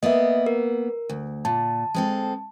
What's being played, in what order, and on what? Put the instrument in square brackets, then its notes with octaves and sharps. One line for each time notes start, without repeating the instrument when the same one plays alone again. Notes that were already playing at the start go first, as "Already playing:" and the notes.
[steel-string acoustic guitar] A#3 B3 [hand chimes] D#5 E5
[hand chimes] A#4
[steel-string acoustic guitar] D2
[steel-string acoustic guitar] A#2 [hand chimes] A5
[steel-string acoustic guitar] G#3 C4 A4